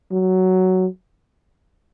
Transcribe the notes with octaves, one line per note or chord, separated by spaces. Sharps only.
F#3